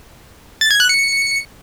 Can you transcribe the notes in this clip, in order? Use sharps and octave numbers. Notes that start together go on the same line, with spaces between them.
A6
G#6
F#6
C#7